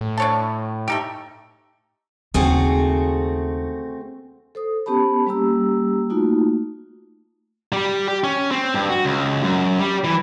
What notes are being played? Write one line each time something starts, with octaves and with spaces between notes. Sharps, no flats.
A2
D4 C#5 A5
A3 D#4 G4
D#2 C#3 A3 C4 F#4 G#4
A4 C5 D#6
B3 C#4 G4 C5 A5 B5
G3 A#3 C#4 G4 A#5 E6
A3 A#3 D#4 F4 F#4
G3
G4
C#4
C4
G2
F#4
C#2
F#2
G3
E3